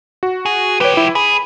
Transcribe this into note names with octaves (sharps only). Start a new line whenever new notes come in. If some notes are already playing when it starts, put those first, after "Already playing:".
F#4
G#4
F3 G4 B4 C#5
E4
G#4 B5